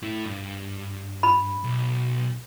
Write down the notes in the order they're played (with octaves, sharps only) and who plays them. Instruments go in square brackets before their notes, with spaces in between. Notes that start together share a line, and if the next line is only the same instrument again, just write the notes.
[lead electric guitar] A2 E4
G2
[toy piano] B5
[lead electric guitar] B1